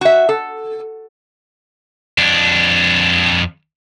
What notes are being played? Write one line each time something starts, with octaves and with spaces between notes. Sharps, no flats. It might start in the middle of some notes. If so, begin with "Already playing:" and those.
F#4 E5
A4
F2 D4